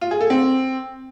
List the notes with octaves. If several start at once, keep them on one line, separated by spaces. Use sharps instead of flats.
F4
G#4
A4
C4